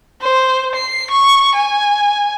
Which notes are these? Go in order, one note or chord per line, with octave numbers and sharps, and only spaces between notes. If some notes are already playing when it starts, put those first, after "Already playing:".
C5
C7
C#6
G#5